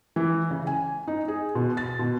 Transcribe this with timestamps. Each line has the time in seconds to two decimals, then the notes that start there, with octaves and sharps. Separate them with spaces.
0.16 E3
0.51 C#3
0.67 G#5
1.08 D#4
1.28 G#4
1.55 B2
1.77 A6
1.99 B2